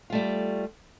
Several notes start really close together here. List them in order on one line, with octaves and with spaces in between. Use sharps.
F4 A3 G3